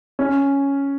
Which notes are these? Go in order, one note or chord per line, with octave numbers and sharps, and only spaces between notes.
C#4